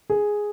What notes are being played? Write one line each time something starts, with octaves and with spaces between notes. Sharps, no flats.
G#4